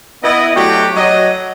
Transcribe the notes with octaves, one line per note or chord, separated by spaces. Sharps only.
B3 E4 D#5
F#3 A3 D4 F#4 G4 G5
F#3 D#5